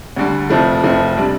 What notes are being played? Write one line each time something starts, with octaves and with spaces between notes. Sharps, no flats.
D2 D3 G3
F1 F2 F3 A3
F1 F2 F3 A3
C3 G3 D4